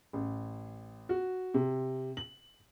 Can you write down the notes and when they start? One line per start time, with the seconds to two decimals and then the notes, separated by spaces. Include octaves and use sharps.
0.13 A1
1.09 F#4
1.54 C3
2.17 F#7